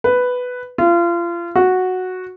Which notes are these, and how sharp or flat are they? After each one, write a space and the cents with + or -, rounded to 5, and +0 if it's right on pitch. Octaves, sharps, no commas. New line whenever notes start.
B4 +5
F4 -30
F#4 -5